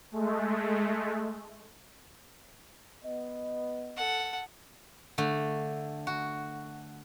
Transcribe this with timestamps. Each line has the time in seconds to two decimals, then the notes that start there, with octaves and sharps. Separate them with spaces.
0.12 G#3 A3
3.04 B3 D#5
3.97 A4 F#5
5.18 D3 A3
6.07 F#4